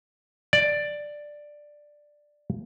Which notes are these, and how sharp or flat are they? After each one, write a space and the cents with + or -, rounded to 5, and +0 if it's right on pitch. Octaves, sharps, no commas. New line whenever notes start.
D5 +5